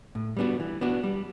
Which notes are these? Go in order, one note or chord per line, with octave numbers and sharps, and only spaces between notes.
A2
G3 B3 D4 F#4
E3
B3 D4 F#4
G3